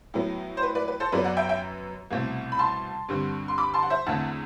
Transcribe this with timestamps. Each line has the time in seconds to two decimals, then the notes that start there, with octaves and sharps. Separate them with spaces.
0.14 A2 F#3 B3
0.57 C5
0.63 B4
0.75 B4 D5
0.88 B4
1.00 A4 C5
1.12 F#2 F#3 B3 B4 D5
1.24 D5 F#5
1.37 E5 G5
1.49 E5 G5
2.11 C2 B2 A3 C4
2.52 B5
2.59 A5 C6
3.09 G2 D3 G3 C4
3.48 C6
3.58 B5 D6
3.74 A5 C6
3.83 F#5
3.90 C5 E5
4.07 E2 D3 A3 C4 F#5 A5